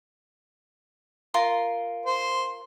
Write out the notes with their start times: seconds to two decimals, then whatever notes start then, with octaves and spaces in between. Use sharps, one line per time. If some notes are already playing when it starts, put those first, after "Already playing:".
1.34 F4 A#4 C6
2.06 C5